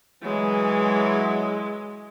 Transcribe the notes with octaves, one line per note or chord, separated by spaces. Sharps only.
E3 F#3 G#3